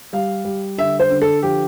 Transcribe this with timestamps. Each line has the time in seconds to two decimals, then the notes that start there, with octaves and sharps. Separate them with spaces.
0.13 G3 F5
0.45 G3
0.78 D3 E5
1.00 C5
1.10 D3
1.22 A4
1.43 F3 G4